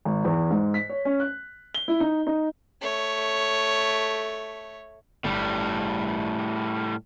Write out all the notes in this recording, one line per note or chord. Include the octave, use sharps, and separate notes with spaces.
G#1
E2
G#2
B6
C#5
C#4
F#6
G7
E4
D#4
D#4
A3 C#5
G1 A2 G3